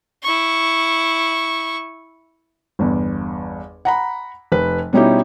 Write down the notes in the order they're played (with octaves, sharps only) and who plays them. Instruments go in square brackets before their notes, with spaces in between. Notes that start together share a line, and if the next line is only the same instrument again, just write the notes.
[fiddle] E4 C#6
[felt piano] G1 E2
F#5 A#5 B5
F1 B4
B2 G3 C#4 D#4 E4 G4